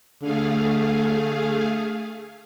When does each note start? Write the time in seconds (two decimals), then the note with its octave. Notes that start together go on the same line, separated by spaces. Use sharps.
0.22 D3 A3 G#4 F5